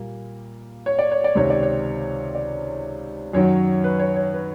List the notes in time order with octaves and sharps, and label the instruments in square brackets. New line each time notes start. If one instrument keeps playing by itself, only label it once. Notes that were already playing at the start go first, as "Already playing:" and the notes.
Already playing: [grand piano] A#2 G3 A#3
C#5
D5
C#5
D5
C#2 C3 D#3 C#5
D5
C#5
D5
F#2 D#3 F#3 C#5
B4
C#5
C#5
B4